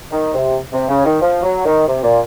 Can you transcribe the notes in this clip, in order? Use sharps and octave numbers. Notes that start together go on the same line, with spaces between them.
D#3
C3
C3
C#3
D#3
F3
F#3
D#3
C3
A#2